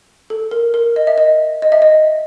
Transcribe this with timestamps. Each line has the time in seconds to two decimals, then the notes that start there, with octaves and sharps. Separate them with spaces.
0.30 A4
0.51 A#4
0.74 A#4
0.96 D#5
1.07 E5
1.18 D#5
1.62 D#5
1.72 E5
1.82 D#5